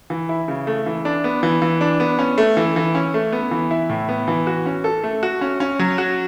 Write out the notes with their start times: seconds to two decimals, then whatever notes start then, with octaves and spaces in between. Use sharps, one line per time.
0.10 E3
0.29 E4
0.48 C#3
0.67 A3
0.86 E3
1.05 D4
1.24 B3
1.43 E3
1.62 E3
1.81 D4
2.00 B3
2.19 C#4
2.38 A3
2.57 E3
2.76 E3
2.95 C#4
3.14 A3
3.32 B3
3.51 E3
3.71 E4
3.89 A2
4.09 B3
4.28 E3
4.47 F#4
4.66 C#4
4.84 A4
5.03 A3
5.23 F#4
5.41 C#4
5.60 C#4
5.79 F#3
5.98 F#4